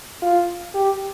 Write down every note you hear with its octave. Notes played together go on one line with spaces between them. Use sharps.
F4
G4